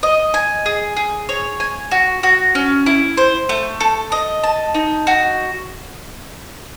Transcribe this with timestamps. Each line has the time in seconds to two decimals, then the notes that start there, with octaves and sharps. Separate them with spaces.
0.03 D#5
0.34 G#5
0.66 G#4
0.97 G#4
1.29 C#5
1.60 G#5
1.91 F#4
2.23 F#4
2.55 C#4
2.86 E4
3.17 C5
3.49 A3
3.80 A4
4.12 D#5
4.43 A5
4.74 D#4
5.07 F#4